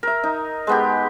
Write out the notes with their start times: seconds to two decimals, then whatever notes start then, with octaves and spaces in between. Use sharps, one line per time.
0.03 A#4 E5
0.24 D#4
0.67 G#3 B3 G4